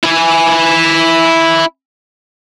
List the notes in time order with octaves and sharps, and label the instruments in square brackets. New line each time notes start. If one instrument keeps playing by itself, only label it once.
[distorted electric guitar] E4 G#5